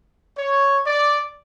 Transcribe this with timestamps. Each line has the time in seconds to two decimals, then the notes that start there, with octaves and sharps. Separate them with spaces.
0.37 C#5
0.87 D5